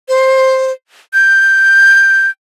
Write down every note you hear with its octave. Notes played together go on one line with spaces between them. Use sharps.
C5
G6